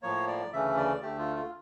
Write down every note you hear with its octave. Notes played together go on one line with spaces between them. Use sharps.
A2 F3 A#3 C#5
D5
D2 C#3 E3 A3 C#4 E5
D5
D2 D3 A3 G4
F4
F4